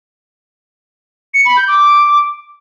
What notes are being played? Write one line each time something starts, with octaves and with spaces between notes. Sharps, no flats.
C#7
B5
G6
D6